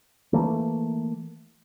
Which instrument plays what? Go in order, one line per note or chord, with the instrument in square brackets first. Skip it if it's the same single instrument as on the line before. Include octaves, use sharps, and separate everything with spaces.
[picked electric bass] E3 A3 A#3